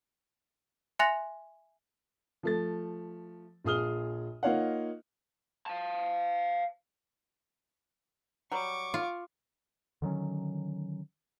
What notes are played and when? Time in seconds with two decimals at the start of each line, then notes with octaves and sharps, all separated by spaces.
0.99 E5 G#5 C6 F#6 A#6 F7
2.43 F3 A3 A6
3.65 A#1 F4 G#4 D#6 F6 G7
4.43 A#3 D#4 F4 C#5 F5 F#5
5.66 F5 A5
8.52 F#3 G3 C#6 D6
8.94 F4
10.02 D3 D#3 F#3 C#4